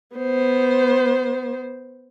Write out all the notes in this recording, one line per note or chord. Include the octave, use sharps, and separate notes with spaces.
B3 C5